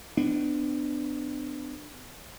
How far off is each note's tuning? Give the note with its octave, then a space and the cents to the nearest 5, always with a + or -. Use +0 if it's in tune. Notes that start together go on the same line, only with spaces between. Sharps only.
B3 +40 D4 +20